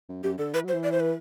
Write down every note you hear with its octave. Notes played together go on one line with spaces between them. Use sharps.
F#2
F#2 G4
D3 A4
E3 B4
F#3 C5
E3
D5
C5
B4